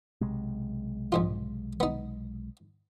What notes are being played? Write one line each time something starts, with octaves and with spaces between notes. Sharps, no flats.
B1 C3 G#3
A#1 G#2 F4
B3 D#4